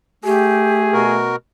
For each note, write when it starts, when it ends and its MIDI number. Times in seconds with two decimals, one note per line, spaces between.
0.24 1.34 57
0.24 1.01 67
0.24 1.17 68
0.93 1.36 47
0.93 1.36 66
0.93 1.36 70